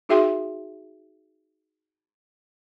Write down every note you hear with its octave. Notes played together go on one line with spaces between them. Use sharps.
D#4 F#4 G#4 E5 G5 C6